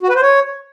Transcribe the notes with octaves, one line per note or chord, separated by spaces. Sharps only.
F#4
B4
C5
C#5